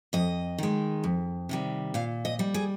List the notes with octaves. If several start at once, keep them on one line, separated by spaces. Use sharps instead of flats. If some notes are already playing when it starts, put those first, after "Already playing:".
F2 D#5
D#3 G#3
F2
C3 D#3 G3
A#2 F5
D#5
G3
G#4